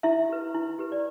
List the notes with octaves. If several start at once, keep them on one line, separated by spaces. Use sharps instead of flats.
E4 E5
G4 B4
E4
G4 B4
D5